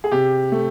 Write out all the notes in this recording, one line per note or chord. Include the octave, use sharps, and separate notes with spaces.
G#4
C3 G4
A3